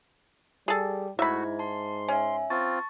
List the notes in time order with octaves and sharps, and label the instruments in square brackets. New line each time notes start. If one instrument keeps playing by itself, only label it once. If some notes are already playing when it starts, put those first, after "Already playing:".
[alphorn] G3 [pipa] G#4 A4
[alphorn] G#2 [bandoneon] A3 F#4 [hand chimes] E4 G#6 [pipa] E5 B5
[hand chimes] A5 [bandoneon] C6
[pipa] C#4 [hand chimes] E5 G#5
[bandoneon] C4 F4 [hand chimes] A5 C#6 A6